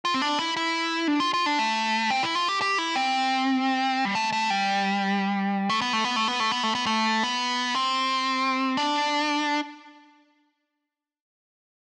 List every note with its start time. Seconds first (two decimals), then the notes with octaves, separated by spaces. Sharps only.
0.05 F4
0.14 C4
0.22 D4
0.39 E4
0.57 E4
1.08 D4
1.20 F4
1.34 F4
1.46 D4
1.59 A3
2.11 C4
2.23 E4
2.35 F4
2.48 G4
2.62 G4
2.78 E4
2.96 C4
4.05 G3
4.15 A3
4.32 A3
4.50 G3
5.70 A3
5.81 B3
5.93 A3
6.04 B3
6.16 A3
6.28 B3
6.40 A3
6.52 B3
6.63 A3
6.75 B3
6.86 A3
7.23 B3
7.75 C4
8.77 D4